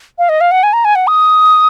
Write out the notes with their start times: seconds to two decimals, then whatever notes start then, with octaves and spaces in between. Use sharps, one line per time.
0.18 F5
0.29 D#5
0.41 F5
0.51 F#5
0.63 G#5
0.73 A#5
0.85 G#5
0.95 F#5
1.07 D#6